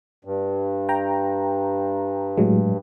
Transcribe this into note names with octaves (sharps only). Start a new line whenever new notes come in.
G2
G5 A#5
A2 F#3 G#3